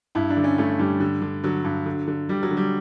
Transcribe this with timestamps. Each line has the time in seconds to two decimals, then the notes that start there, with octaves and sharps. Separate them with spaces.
0.15 G2 E4
0.30 D4
0.37 D3
0.44 C#4
0.58 G2 A3
0.79 G2 G3
1.00 D3
1.22 D3
1.44 D3 F#3
1.64 G2
1.86 D3
2.08 D3
2.29 D3 G3
2.43 F#3
2.51 D3
2.57 G3